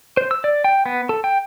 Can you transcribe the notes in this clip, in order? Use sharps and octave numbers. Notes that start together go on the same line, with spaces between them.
C5
E6
D5
G5
B3
A4
G5